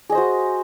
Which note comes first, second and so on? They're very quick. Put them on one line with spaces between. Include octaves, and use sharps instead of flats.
G#4 D#5 C5 F#4